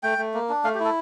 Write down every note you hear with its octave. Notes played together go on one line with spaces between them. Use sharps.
A3 G5
A3
A#3
D4
A3 F5
G4
E4
A4